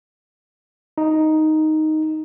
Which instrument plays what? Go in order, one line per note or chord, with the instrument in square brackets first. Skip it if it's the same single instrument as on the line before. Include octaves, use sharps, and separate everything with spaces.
[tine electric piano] D#4